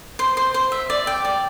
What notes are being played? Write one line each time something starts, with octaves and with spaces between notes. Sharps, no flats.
C5
C5
C5
E5
D5
G5
D5